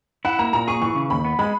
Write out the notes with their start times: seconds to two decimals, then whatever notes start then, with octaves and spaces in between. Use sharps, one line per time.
0.25 E4 F#5
0.39 A#3 A#5
0.53 A#2 A#5
0.68 G#4 C#6
0.81 E3 C#6
0.96 C#3
1.10 D#2 B5
1.25 B3
1.39 G#3 B5